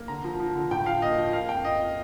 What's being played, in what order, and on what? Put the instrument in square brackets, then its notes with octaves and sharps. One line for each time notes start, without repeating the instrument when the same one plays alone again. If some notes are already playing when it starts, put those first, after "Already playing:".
Already playing: [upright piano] A#3
D3 A#5
F3
F3
D3
A2 G5
F3 F5
A#3 D#5
F3
A#3 F5
F2 G5
F2 D#5